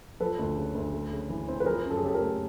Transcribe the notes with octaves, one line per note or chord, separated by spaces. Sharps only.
F3 A4 B4
D2
C#3
D2
A3
C#3
E3
C4
B4
F3 G#4 A#4
F#2
A4
G#4
C#3 G4 A4
G#4 A#4
A3